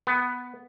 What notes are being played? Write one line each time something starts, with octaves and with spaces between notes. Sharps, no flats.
B3